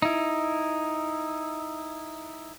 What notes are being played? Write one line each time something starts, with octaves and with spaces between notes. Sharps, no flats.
D#4 E4